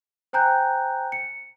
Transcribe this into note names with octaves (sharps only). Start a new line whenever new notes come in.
C5 G5 G#5 A#5 F#6 G6
C#7